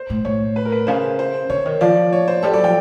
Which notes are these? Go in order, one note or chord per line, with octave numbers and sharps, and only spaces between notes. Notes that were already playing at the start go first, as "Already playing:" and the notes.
Already playing: C5
A2
A2 C#5
B4
A#4
B4
C#3 C5
C5
D3 C#5
D#3
F3 D5
C#5
C5
G3 A4
F#3 D5
F3 G5